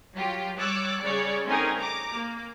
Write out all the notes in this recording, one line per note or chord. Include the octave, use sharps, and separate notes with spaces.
F#3 F4 G4
G3 C#5 D6 E6 F#6 A6
C#3 G3 C#5 D5
A3 C4 C#4 D#4 G#4 A#4
A#5 D6
A#3